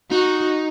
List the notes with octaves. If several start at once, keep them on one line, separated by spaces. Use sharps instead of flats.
D#4 F#4